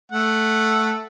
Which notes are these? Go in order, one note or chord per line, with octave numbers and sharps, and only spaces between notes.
A3 F#5